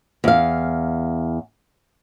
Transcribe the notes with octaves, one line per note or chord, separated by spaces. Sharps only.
E2 F5